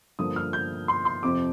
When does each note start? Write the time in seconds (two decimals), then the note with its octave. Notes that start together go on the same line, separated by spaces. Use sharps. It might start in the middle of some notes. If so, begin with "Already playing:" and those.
0.19 G2 D3 F3 A#3 D#6
0.36 F6
0.53 G6
0.88 C6
1.05 C6
1.23 F2 C3 F3 C4 D6